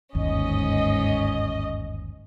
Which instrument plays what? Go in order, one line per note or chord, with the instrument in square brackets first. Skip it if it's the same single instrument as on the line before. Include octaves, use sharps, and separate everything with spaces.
[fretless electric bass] G1 D#2 [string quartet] G#2 C#4 [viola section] D#5